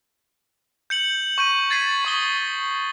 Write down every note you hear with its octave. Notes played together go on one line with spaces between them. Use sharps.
G6 C#7 F#7
C#6 G6 D#7
G#6 A6 B6 C7 D#7
C#6 D#6 G7